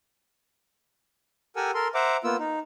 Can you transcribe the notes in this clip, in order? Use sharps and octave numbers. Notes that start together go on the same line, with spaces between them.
G4 A4 A#4 F#5 G#5 E6
A4 A#4 C6
C5 E5 F#5 A#5 D6
A#3 B3 F4 E6
D#4